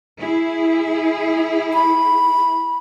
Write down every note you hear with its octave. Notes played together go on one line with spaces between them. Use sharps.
E4 G#4
B5